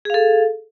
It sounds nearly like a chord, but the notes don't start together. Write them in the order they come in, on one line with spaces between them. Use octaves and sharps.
G#4 F5 A4